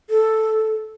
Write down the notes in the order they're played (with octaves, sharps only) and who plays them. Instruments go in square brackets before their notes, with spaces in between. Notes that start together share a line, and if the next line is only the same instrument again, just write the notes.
[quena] A4